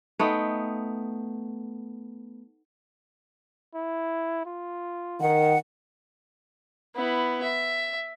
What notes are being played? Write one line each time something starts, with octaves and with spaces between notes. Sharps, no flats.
A3 B3 D#4 G5
E4
F4
D#3 F#5
B3 E4
E5